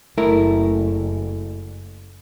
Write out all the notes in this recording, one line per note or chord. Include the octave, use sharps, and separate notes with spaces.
F#1 A3 E4 A#4